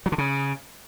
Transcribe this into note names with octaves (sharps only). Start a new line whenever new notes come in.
F#3
D3
C#3